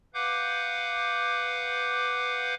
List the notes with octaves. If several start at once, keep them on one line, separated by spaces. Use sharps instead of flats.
B4 F5 F#5 D6 G6